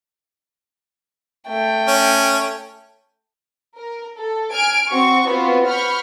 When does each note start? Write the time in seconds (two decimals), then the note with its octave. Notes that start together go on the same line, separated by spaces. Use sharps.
1.48 A3 G5
1.88 C#4
3.77 A#4
4.18 A4
4.51 G#5 F6 G#6 D7
4.90 C4 F#4 C#6
5.26 B3 C4 F4 F#4
5.65 F#5 B5 C#6 F6 G6